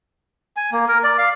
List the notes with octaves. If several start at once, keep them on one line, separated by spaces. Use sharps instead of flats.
G#5
A#3
A#4
D5
F5